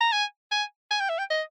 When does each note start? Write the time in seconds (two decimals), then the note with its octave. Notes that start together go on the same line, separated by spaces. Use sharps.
0.01 A#5
0.12 G#5
0.51 G#5
0.91 G#5
1.00 G5
1.09 E5
1.19 G5
1.30 D#5